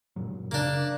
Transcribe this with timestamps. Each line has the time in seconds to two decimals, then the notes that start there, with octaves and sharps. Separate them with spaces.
0.16 F#2 A#2 F#3
0.51 C#3 A#3 D4